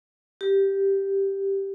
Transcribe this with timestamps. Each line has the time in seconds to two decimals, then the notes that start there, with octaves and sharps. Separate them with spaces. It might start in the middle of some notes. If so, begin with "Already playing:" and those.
0.41 G4